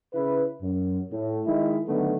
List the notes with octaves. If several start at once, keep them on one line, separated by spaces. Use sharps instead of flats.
C#3 E4 B4
F#2
A2
D#3 G#3 E4
D3 D#3 F#3 A3 B3